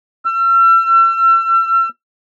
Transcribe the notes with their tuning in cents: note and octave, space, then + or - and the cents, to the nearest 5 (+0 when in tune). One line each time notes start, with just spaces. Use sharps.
E6 +40